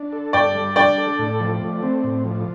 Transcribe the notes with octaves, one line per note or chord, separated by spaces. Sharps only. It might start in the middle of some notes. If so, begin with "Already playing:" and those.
Already playing: D4
A4
G2 D5 G5
G3
D4 D5 G5
A4
A2
F3
A3
C4
A2
F3